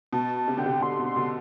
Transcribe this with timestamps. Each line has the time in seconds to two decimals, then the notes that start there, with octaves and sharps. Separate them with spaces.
0.13 B2 A5
0.36 A5
0.48 C3
0.57 D3 G5
0.66 C3
0.81 B2 D3 C6
1.00 B2
1.05 C6
1.16 B2 D3